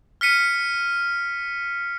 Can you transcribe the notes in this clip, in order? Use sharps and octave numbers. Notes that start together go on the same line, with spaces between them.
F6 B6 C#7 D#7